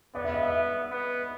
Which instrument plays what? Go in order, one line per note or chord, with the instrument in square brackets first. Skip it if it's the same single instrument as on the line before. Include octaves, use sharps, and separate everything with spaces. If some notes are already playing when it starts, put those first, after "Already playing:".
[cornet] B3 [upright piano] D5
[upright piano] E5
D#5
E5
[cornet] B3